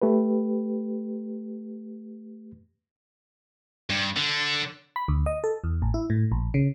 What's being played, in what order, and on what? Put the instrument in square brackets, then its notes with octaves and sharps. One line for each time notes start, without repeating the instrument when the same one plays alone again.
[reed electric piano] A3 G4 B4
[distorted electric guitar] G2
D3
[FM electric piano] B5
D2
D#5
A4
E2
A1
E4
A2
A#1
C#3